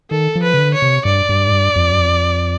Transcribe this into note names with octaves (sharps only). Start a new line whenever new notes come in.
D#3 A4
F3
B4
C#3
D3
C#5
C3
G2 D5
G2
G#2
G2
F2
F#2
F2